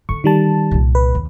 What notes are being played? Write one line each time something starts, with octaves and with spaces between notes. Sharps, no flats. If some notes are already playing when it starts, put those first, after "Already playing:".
D3 D4 C#6
D#3 G3 A5
C2 A#2
B4
D#2